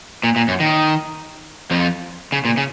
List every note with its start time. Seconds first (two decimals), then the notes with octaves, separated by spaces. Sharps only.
0.24 A#2
0.36 A#2
0.48 F#2
0.60 D#3
1.71 F2 F3
2.32 C#3
2.45 A#2
2.57 C#3